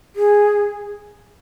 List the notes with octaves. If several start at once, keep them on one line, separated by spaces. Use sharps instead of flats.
G#4